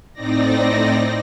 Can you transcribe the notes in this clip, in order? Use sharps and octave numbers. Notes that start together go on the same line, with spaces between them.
A2 C4 D#4 D5 A#6